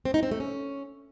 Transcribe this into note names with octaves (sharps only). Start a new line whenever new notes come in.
C4
D#4
C4
A3
C#4